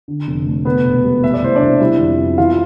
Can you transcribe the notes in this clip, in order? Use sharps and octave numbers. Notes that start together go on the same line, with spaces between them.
D3
F1
A3
C3 B3 B4
E1
G3
A3 E5
D5
C2 C5
D4 D5
C2
G3 E4 E5
F2
F2
E3 F4 F5